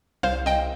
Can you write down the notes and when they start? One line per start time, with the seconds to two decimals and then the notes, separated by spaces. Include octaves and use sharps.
0.23 C2 C5 F5
0.46 C2 D#5 G5